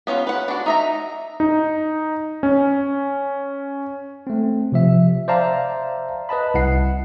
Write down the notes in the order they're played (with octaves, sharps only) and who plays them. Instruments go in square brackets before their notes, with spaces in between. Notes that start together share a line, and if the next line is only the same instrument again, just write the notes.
[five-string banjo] B3 C#4 E4 F4
B4 F#5
D4 F#4
D#4 E5 A#5
[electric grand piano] D#4
C#4
[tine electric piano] A3 C4
C3 F3 E5
C5 D5 E5 F5 A5 A#5
B4 D#5 A5 B5
C2 E4 F#5 C7